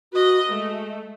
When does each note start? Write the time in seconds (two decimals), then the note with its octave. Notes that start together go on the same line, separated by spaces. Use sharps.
0.13 F#4 B4 D#5
0.49 G#3 A3